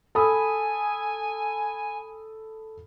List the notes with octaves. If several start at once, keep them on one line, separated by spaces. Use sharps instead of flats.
A4 G#5 B5 D#6